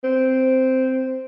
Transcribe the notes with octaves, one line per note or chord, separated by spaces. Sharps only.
C4